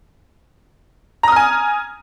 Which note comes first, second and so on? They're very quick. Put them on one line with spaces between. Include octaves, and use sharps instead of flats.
A#5 D#6 F6 G#5